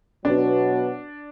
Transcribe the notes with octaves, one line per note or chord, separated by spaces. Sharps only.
B2 F#3 B3 D4 F#4